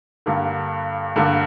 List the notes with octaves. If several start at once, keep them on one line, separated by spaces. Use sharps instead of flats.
G2 D3 G3 A#3
G2 D3 G3 A#3